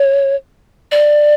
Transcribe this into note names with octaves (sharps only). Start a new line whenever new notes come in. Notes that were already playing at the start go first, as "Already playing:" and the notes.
Already playing: C#5
D5